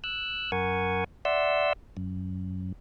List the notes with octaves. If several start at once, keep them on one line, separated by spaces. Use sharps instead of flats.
E6 F#6
F#2 A#4 F#5 G#5 C#6
D5 E5 F#5 C6 E6
F#2